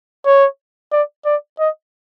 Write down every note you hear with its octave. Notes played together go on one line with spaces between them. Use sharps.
C#5
D5
D5
D#5